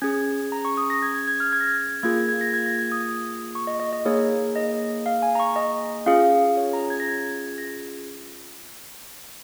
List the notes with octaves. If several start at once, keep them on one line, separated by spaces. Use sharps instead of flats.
C#4 G#4 G#6
A#5
C#6
D#6
A#6
G#6
G#6
G#6
F6
G#6
A#6
G#6
A#3 F4 G#4 G#6
G#6
A#6
G#6
A#6
G#6
D#6
C#6
D#5
D#5
D#5
A#3 D#4 G#4 C#5
D#5
F5
G#5
A#5
C#6
D#5
C#4 F4 G#4 F5
C#5
A#5
G#6
A#6
G#6
A#6